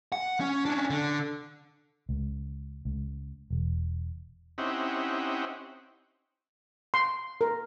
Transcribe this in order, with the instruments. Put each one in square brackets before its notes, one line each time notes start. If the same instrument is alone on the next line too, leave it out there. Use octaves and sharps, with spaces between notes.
[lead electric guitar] F#5
C#4
C#4 D4
D3
[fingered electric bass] C#2
C#2
E1
[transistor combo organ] C4 C#4 D#4 E4 G4 F#5
[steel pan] C6
A#4